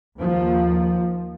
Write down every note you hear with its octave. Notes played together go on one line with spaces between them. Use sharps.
D#2 F3